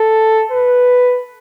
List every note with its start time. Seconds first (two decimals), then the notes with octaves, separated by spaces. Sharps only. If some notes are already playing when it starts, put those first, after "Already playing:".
Already playing: A4
0.51 B4